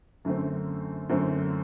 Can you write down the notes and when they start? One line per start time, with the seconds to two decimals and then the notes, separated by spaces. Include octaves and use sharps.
0.25 F#2 D3 A3 C4
1.09 F#2 D3 A3 C4